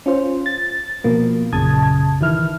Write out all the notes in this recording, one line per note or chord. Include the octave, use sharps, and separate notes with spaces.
C#4 F4 C5
A6
B2 F3 A#3
A#1 F#2 C#3 A5 D#6 G#6
D#3 E3 E4 F6